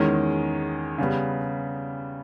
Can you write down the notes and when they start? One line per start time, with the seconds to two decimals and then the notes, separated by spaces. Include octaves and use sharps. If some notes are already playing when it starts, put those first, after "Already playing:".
Already playing: E2 D#3 G#3 C#4
0.98 C#3 G3 B3